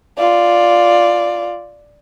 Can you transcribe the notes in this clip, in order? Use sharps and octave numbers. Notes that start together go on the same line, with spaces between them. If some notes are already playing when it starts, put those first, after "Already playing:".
F4 D5